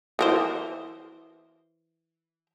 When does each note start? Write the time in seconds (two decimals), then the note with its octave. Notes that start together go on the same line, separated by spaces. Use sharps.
0.19 E3 A#4 C5